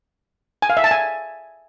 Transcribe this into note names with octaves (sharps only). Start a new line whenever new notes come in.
G#5
F5
E5
A5
G#5